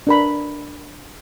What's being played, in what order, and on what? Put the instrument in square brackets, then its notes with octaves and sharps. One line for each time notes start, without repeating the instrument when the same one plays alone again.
[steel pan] D4 A#4 B5